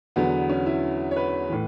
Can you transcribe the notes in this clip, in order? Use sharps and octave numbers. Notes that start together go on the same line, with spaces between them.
E2 D3 F#3 B3
C#4
E4
C#5
B4
A2 E3